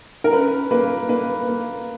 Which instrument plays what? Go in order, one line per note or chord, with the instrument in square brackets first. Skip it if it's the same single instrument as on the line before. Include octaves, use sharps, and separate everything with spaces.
[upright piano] A#4
C#4 B4
A#3 B4
A#3 B4
A#3